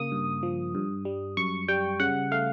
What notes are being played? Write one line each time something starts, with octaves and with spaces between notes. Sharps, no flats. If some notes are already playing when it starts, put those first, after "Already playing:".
Already playing: C#3 A#3 D#6
G2
F3
G2
G3
F#2 C#6
G3 G5
C#3 F#5
A3 F5